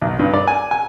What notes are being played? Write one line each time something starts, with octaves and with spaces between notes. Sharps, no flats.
B1
G2
D5
G#5
G#5